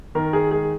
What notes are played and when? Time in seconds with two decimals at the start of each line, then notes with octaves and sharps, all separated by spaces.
0.15 D#3 A#4
0.33 G#4
0.51 G#3 G#4